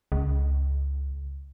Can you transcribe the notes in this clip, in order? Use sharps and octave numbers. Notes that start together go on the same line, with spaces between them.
C#2